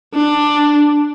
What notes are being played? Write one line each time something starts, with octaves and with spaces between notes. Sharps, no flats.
D4